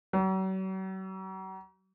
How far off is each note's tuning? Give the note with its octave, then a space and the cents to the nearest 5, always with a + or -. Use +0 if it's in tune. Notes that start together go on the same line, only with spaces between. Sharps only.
F#3 +40